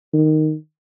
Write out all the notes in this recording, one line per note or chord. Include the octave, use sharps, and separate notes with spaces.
D#3